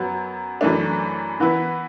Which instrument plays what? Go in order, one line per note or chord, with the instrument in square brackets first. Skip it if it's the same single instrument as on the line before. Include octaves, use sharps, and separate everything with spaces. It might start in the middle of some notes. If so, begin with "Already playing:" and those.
Already playing: [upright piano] F#2 F#3 B3
F#2 E3 A3 D4
E3 B3 E4 B4